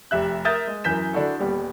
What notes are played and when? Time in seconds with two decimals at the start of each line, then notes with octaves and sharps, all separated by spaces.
0.11 F1 G4 E5 F#6
0.45 A#4 E5 D#6 G6 A6
0.67 G#3
0.84 F#2 E3 A#4 G6 B6 E7
1.13 D3 D4 E4 F#4 A4
1.40 D#1 G3 B3